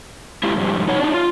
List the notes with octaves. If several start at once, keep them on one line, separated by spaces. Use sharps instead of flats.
G#3 E4 F4 G4
F2 G#2 G3
D#4 C#5 F#5
D4 D#4
F4